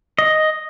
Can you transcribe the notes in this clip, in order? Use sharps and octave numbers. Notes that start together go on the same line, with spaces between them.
D#5